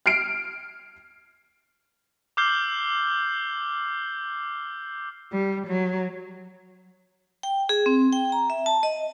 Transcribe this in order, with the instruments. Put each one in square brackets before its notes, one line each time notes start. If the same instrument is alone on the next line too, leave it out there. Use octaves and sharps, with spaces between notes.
[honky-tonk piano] F6 C7 D7
[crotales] D6 E6 F6 G6 C7 G7
[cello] G3
F#3
[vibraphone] G5
G#4
C4
G5
A#5
E5
A5
D#5